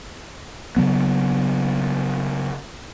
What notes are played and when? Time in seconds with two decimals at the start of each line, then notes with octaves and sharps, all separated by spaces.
0.77 C#3 F#3 B3